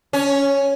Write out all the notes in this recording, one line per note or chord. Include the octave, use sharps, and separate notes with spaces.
C#4